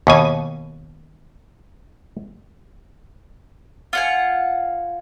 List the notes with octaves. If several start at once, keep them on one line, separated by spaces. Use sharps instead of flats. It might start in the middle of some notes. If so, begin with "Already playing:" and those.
D#2 B2 G#5
F4 F#5 G#5